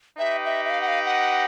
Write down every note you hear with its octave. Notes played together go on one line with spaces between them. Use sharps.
D#4 G4 B4 D#5 E5 G5
E5
E5
F5
F#5
F5
F#5